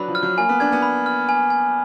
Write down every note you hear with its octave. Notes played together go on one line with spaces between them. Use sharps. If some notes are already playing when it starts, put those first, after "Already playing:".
Already playing: F#3 D4 B4 D5 B5
F3
F6
F#3
A#3 G#5
B3
D4 G#6
B3
B5
F6
G#5
G#5